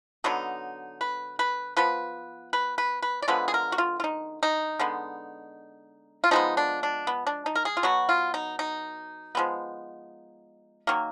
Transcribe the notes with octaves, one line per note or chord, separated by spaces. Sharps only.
D3 F#3 B3 D#4
B4
B4
F3 B3 B4
B4
B4
B4
D5
D3 F3 G#3 B3 B4
G#4
A#4
F#4
F4
F4
D#4
D#4
D3 G#3 B3
F4
F3 G#3 B3 D#4
D4
D4
B3
D4
D#4
A#4
G#4
F4
B2 F#3 B3 F#4
F4
D#4
D#4
F3 G#3 B3
D#3 F#3 A#3